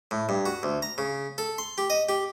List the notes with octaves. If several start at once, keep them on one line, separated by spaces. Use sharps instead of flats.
A2
G2
F#4
D2
A#5
C#3
A4
C6
G4
D#5
G4